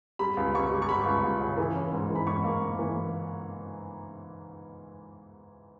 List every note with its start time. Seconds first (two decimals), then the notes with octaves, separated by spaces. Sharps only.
0.19 G3 B5
0.37 C#2
0.54 C#2 C#6
0.71 G3
0.82 C#6
0.89 G3 B5
1.06 C#2
1.23 C#2
1.40 C#3
1.57 E3
1.75 C#4
1.92 G#2
2.10 E3
2.16 B5
2.27 G#2 C#6
2.44 A#3
2.62 A#3
2.79 E3